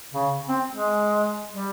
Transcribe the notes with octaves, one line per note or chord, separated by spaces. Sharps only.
C#3
C4
G#3
G3